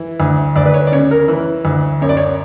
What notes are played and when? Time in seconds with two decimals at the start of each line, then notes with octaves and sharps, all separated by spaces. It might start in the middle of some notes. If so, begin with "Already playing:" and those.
Already playing: E3
0.20 D2
0.56 D2 D5
0.65 B4
0.74 C#5
0.87 D5
0.92 C#3 C#5
1.11 A#4
1.28 E3
1.65 D2
2.01 F#2 C#5
2.09 D5
2.17 C#5